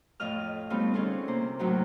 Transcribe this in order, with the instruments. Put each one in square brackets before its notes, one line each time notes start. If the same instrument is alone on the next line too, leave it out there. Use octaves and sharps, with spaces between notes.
[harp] F2 A2 F4 D#5 F6
G3 A3 B3 C4 D#4 F4
D3 C4 C#4 G#4 A4 C5
C3 A#3 C5
F#2 A2 C3 F#3 D#4